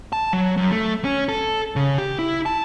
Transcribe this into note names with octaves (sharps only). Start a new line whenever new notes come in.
A5
F#3
F#2
A3
C#4
A4
C#3
G4
E4
A5